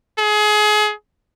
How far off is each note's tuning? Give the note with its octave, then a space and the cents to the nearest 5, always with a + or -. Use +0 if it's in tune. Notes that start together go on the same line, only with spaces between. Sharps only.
G#4 +30